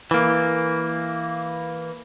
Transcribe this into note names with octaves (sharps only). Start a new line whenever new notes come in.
E3 A#3